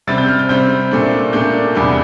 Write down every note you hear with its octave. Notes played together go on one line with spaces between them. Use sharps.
C3 G3 C4 A6
G6
F6
G6
C3 G3 C4 G6
A#2 A3 D4
A#2 A3 D4 G6
E2 C3 G3 D4